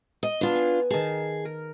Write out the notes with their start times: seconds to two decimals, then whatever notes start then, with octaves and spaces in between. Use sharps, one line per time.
0.23 D#5
0.41 B3 D4 F4 B4 A5
0.55 G#5
0.90 D#3 G#4 A5 A#5
1.45 A#4